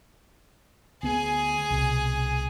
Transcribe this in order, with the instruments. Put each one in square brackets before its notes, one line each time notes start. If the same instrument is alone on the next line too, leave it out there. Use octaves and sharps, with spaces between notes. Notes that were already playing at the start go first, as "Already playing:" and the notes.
[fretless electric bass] D2 B3 [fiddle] G#4 G#5
[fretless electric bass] C2 B2